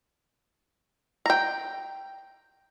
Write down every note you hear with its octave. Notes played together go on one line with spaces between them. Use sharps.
G5 A#5